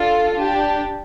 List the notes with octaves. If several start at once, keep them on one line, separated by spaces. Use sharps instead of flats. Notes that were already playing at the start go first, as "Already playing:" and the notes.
Already playing: D4 F4 A4
D4 G4